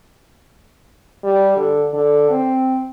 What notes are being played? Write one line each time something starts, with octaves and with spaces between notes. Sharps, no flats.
G3
D3
D3
C4